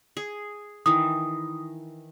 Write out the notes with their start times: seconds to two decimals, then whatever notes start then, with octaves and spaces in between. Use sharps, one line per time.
0.17 G#4
0.86 D#3 E3 D#6